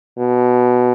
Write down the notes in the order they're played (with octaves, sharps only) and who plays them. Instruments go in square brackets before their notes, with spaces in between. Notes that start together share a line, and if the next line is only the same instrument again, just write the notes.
[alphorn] B2